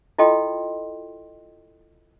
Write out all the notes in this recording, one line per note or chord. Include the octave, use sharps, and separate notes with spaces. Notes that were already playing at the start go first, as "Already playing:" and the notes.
E4 F4 A4 D#5 G5 C6